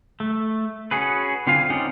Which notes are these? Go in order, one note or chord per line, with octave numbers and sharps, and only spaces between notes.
A3
C#4 F#4 G#4 B4
D3 C4 F4 F5 G#5
C4 C#4 D#4 D5 F#5